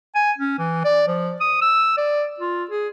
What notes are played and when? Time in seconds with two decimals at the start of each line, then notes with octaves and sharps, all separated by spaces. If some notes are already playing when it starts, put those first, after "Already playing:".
0.15 G#5
0.38 C#4
0.59 E3
0.85 D5
1.08 F3
1.41 D#6
1.62 E6
1.98 D5
2.40 F4
2.71 G#4